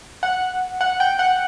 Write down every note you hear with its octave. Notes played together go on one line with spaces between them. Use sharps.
F#5
F#5
G5
F#5